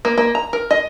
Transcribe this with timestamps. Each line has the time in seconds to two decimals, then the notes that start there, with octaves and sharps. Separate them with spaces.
0.05 A#3
0.18 A#3
0.35 A#5
0.53 A#4
0.71 D#5